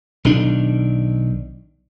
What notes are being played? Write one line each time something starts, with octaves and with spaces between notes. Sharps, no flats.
B1 D#3 D4